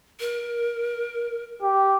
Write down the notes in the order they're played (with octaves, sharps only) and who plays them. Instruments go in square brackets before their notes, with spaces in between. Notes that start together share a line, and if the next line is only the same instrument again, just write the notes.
[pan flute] A#4
[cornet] G4